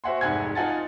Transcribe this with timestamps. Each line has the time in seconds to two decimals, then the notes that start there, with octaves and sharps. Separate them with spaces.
0.04 F#4 C5 E5 F#5 G#5 C6
0.21 F1 G#2 F#5 G#5 G#6
0.55 D#4 F4 F#5 G#5 A5 A6